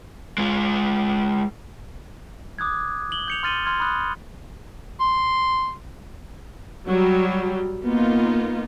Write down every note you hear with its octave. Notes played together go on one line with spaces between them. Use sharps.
G#3 F4
D6 D#6 F#6 G#6
F#7 G7
G6 C#7 F7
C6 F6 A6 D#7 F#7 G7
C6 F6 G#6
B5 D#6 F#6
C6
F#3 G3
A#3 B3 D#4 F4